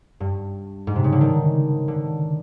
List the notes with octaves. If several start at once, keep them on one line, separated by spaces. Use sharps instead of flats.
G2
G#2
C3
C#3
D3
D#3
D3